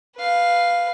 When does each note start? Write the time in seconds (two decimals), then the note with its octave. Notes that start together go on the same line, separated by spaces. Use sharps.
0.16 B4 F5